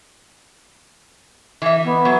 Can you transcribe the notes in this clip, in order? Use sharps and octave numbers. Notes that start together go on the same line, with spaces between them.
E3 E5
B3
F#3